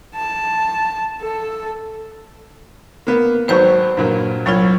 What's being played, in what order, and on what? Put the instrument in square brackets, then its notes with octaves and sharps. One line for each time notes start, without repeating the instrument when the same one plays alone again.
[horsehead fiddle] A5
A4
[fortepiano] A#3 B3
[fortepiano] G#1 F#3 C#6 [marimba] B4 C5 G6
[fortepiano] G2 A#2 F#3
[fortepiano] C2 C#5 [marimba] F#3 F4